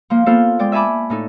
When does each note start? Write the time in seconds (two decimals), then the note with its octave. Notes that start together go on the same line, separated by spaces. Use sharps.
0.10 F3 A#3
0.26 A#3 B3 F4 A4 C5
0.59 G#3 D5 G5
0.72 E5 G#5 A5 B5 D6
1.10 A2 D#4 A4